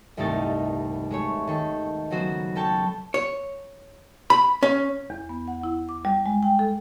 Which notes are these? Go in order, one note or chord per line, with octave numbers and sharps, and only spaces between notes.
D#1 C2 G2 A3 D#4 A6
G#3 A3 C#5
D#3 A4
C#3 F#3 B3 F#4 C5
C#4 A4 G5 A5
C#5
B5
C#4
E2
B3
F#5
E4
D6
G3
G#3
G5
A4